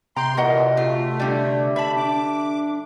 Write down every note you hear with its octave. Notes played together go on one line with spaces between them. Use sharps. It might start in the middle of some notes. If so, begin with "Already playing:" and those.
C3 G4 A#5 C6
A#2 E3 F#4 D#5 F#5
A#2 A3 F4
D3 G3
E5 A5 B5
D4 D6